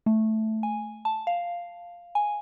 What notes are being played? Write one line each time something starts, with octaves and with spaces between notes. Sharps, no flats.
A3
G#5
A5
F5
G#5